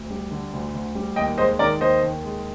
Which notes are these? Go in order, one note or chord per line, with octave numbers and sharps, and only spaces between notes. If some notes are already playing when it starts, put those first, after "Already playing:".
Already playing: D2
G3
D3
D2
D2
G3
D#2 D#5 G5
G#3 C5 D#5
D#3 A#4 D5
D#2 C5 D#5
D#2
G#3